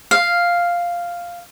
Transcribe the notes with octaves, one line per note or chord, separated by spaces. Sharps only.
F5